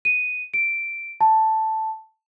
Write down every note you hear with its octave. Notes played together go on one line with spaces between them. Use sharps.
D#7
D7
A5